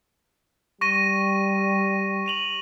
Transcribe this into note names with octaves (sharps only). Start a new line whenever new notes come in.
G3 C#6 A#6 D#7
D#7 F7 F#7